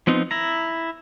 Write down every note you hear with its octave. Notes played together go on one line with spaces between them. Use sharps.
F3 B3 C4 D#4
E4 A#5